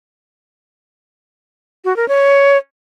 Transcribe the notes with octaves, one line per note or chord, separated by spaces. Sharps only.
F#4
A#4
C#5